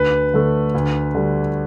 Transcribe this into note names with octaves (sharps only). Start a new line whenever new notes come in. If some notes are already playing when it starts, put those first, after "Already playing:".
Already playing: D2 B4
D3 A3
D2
D3 G3